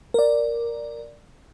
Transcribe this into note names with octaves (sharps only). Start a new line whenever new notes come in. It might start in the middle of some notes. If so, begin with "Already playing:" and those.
A#4 D5